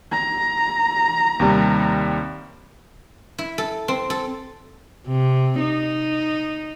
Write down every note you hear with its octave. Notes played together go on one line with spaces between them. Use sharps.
A#5
D#2 C3 G3
E4
A4
C4
A4
C3
D#4